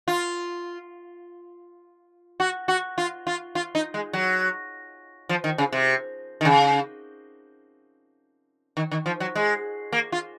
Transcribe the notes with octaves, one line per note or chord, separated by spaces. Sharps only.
F4
F#4
F#4
F4
F4
F4
D#4
G#3
F#3
F3
D#3
C#3
C3
D#3
C#3
D#3
D#3
F3
F#3
G#3
A#3
F4